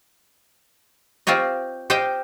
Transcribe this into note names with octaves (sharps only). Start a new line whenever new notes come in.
C4 F4 G4 C#5 D#5
G4 C5 D#5 F5 G5